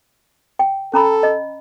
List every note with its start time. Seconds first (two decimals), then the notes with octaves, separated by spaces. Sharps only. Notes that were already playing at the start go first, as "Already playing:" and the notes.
0.59 G5
0.94 C#4 A4 A#5 B5
1.23 D#5